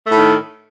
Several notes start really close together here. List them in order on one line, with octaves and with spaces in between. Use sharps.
A3 A2 D#3